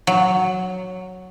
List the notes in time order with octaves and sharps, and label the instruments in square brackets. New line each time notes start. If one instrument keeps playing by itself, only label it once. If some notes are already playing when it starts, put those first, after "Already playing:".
[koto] F#3